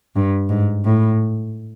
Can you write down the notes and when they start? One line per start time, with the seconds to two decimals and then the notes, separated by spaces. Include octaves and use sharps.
0.16 G2
0.49 G#2
0.85 A2